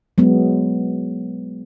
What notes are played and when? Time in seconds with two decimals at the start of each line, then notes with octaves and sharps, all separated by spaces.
0.18 F#3 G#3 B3